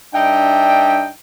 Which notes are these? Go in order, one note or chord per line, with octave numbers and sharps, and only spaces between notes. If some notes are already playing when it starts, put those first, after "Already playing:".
G2 D4 D#4 E5 G5